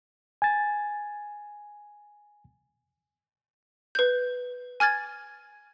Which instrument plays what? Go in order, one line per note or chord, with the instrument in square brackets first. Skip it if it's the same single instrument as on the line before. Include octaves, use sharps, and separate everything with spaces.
[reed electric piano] G#5 A6
[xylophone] B4 G6
G#5 F6 G#6 A6